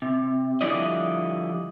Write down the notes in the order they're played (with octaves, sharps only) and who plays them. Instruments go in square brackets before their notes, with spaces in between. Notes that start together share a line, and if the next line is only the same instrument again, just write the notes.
[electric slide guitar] C3
D3 F3 G3 E4 D5 D#5